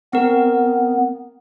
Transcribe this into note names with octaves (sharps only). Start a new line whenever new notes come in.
B3 C4 A#4